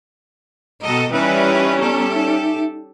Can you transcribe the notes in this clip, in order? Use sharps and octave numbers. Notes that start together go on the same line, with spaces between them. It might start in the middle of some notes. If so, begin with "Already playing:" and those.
B2 A4 D#5 G5 A#5
E3 G3 C#4 D#4 B4 D5 E5 G5
B3 G4 A4 A#5
D#4 E5